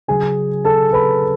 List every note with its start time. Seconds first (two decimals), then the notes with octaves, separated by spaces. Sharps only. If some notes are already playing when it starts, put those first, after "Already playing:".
0.08 C#3 F#3 C#4 G#4 G#5
0.65 A4 A5
0.93 B4 B5